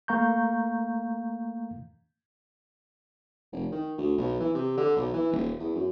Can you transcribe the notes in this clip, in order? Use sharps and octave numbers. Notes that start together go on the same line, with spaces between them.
A3 A#3 F5 A#5 C#6 G6
F1
D#3
D2
B1
E3
C3
D3
B1
E3
D#1
E2
F#2